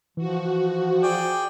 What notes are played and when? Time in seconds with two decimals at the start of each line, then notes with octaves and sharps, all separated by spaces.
0.17 E3 F3 F#4
1.03 G#4 D5 G5